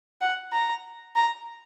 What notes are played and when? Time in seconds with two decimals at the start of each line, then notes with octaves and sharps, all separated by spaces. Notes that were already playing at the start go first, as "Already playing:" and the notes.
0.21 F#5
0.52 A#5
1.16 A#5